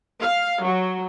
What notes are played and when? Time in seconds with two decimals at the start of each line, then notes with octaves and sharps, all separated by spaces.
0.20 F5
0.63 F#3